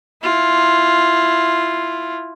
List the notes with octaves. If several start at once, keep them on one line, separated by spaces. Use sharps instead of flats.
E4 F4